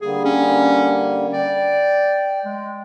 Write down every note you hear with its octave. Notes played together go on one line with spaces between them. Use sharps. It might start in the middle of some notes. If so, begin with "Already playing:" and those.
D3 G3 A#3 G#4
C#4
D5 G5
G#3